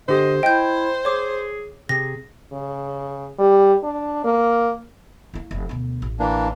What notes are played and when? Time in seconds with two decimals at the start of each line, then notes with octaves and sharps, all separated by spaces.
0.08 D3 G4 C5 D#5
0.43 E4 D#5 G5 G6
1.05 G#4 C#5 D6
1.89 C3 G#4 A#6
2.53 C#3
3.39 G3
3.83 D4
4.25 A#3
5.34 A#3 E4
5.51 F1
5.69 D2 B2
6.02 A1
6.19 E3 A#3 D4